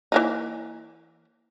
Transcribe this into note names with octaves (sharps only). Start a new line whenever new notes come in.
E3 A#3 D#4